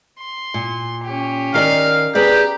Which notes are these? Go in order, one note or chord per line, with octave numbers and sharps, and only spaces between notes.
C6
A#2
C#4 G4
D#3 A#4 D5 F5
G4 G#4 B4 D5 A#5